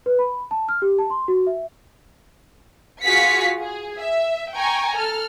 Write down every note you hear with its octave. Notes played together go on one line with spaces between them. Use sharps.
B4
B5
A5
F6
G4
A5
C6
F#4
E5
F4 F#4 G#4 F5 B6 C#7
G#4
E5
G5 G#5 A#5 C#6
A4 F6